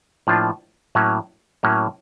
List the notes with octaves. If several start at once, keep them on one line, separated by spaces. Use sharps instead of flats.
A2 F3 A#3 D4 F4
A2 F#3 A#3 C#4
A2 F#3 A#3 C#4